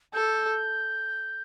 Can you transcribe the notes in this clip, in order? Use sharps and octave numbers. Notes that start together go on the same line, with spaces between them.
A4 G6